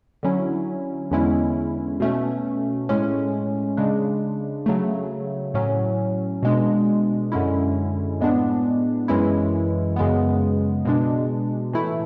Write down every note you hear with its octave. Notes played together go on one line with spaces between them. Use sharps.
D3 F#3 C#4 E4
E2 D3 G#3 C#4 E4
B2 A3 C#4
A2 G#3 C#4
C#3 G#3 D4
C#3 F#3 A3
A2 F#3 C#4
B2 G#3 D4
F#2 D3 G#3 C#4 E4
A2 G#3 B3 D4
F#2 E3 G#3 C#4 E4
F#2 C#3 G#3 B3
B2 G#3 D4
A2 E3 A3 E4